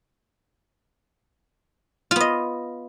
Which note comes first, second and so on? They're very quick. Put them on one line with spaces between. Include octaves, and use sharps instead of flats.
F4 B3 D#5